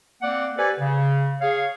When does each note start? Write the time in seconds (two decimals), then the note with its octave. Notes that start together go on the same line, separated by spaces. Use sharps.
0.22 A#3 C4 D5 F#5
0.58 G4 A4 B4 C5 D5 G#5
0.80 C#3
1.42 G#4 C#5 F5